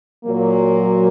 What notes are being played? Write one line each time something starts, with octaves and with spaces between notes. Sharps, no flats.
A#2 F#3 A#3